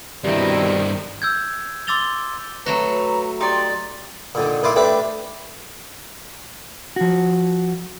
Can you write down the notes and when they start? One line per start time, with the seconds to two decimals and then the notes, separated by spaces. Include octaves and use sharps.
0.24 G2 B2 D#3 G3 C4 E4
1.22 E6 G6 G#6
1.87 C6 D6 E6 A6 F7 G7
2.66 F#3 A3 F#4 B4 A#5
3.41 D#4 G4 D5 C6
4.35 A#2 D3 D#3
4.63 A#2 D#3 E4 F4 C6 D6
4.76 A3 D4 G4 B4 E5
6.96 F3 F#4